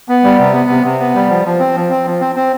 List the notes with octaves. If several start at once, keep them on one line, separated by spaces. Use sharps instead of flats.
B3
G3
C3
B3
C3
C3
B3
G3
F3
F3
C4
F3
C4
F3
C4
C4